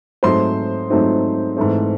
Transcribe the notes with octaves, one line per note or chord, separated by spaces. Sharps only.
G#2 F#3 A3 C4 D#4 C5 C6
G#2 F#3 A3 C4 D#4
G#2 E3 A3 C4